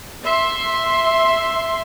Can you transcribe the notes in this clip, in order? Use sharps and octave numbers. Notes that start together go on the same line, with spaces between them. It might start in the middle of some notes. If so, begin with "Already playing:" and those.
E5 C6